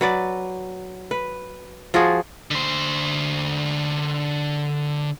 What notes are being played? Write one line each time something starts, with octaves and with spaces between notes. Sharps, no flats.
F#3 B4 D5
B4
F3 F4 F#4 G#4
D3 C5